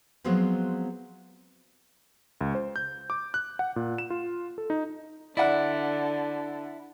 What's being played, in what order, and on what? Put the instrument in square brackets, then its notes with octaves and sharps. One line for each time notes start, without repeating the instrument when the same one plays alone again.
[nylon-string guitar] F3 F#3 G#3 B3 C4
[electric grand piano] C#2
C5
G6
D6
F#6
F#5
A#2
E7
F4
A4
D#4
[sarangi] D3 [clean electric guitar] E4 [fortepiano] D5 F#5